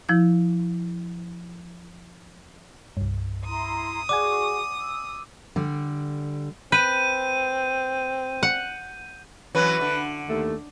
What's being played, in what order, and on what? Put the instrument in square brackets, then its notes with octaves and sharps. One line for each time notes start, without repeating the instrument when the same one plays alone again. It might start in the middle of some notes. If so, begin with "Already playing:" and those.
[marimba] F3 E4 G6
[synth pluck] C2 G2
[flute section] E4 A#5 C6 [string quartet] D#6
[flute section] F#4 G#4 C#6 [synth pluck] D5 F#5 G#5 [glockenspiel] D6
[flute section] E6
[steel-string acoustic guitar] D3 G3
[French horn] C4 [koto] B4 [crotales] G6 D#7
[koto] F#5
[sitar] E3 F#3 C#4 [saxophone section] B4
[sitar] D3
[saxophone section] D#2 A3